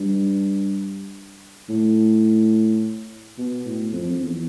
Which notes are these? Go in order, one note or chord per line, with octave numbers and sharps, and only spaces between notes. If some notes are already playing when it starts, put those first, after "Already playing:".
Already playing: G2
A2
B2
A2
F2
F2
E2